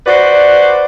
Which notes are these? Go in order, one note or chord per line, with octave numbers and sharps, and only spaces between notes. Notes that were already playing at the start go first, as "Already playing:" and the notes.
F#4 B4 C5 D5